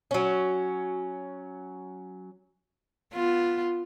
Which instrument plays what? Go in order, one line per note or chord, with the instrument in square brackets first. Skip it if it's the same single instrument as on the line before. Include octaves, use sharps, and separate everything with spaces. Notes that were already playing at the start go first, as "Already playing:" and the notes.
[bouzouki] F#3 C#4
[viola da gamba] B3 F4